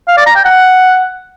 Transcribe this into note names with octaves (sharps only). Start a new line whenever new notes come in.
F5
D5
A#5
G5
F#5